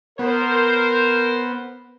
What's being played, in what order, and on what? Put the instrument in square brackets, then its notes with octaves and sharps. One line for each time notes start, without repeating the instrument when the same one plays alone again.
[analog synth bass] B3 [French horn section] A#4 C5